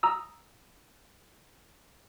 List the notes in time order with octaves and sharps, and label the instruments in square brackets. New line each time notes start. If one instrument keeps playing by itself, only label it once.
[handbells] A#5 D#6 E6